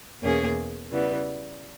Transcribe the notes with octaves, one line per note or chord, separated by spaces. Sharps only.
E2 B2 A#3 C#4 G#4
C#3 E3 G3 B3